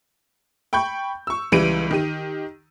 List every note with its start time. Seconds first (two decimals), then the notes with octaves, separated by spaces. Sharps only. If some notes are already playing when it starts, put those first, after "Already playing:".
0.73 G5 B5 C#6 G6
1.27 C#6 E6
1.52 C#2 E3 G3 D7 D#7
1.91 D#3 G4 D#7